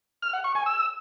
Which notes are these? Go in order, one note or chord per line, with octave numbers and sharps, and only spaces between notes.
F6
F#5
C#6
G#5
E6